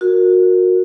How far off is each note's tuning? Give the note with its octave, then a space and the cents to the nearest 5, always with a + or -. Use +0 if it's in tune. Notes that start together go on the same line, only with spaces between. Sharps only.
F#4 -25 A#4 -15